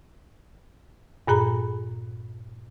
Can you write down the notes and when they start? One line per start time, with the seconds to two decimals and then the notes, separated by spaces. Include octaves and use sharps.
1.27 G2 A#2 G#4 A#5 B5